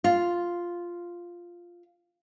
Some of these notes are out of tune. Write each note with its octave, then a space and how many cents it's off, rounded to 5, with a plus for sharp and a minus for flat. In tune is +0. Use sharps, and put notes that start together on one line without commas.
F4 +0